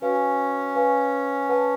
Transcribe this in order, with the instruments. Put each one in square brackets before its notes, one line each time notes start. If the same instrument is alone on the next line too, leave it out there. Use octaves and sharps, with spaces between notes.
[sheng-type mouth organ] C#4 [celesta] F#4 B4 F5 G#5
[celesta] B4 F5 G#5 C#6
B4 F#5 A5